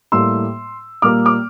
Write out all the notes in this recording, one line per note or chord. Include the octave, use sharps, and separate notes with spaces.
A2 G3 A#3 C6 E6
A#2 G3 A#3 D6 F6
D6 F6